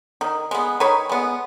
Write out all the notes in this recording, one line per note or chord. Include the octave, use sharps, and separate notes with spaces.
D#3
G#3 B3
D#3 B4 C#5
G#3 B3